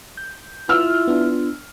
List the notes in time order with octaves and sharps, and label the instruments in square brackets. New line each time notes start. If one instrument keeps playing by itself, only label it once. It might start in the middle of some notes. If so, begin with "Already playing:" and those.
[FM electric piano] G6
[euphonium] E4 [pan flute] F4 [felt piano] E6 F6
[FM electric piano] B3 D4